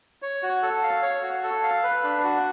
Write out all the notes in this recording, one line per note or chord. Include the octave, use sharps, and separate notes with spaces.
C#5
F#4
A4
F5
C#5
F#4
A4
F5
B4
D4
F#4